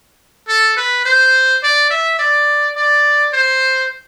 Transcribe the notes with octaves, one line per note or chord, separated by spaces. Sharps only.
A4
B4
C5
D5
E5
D5
D5
C5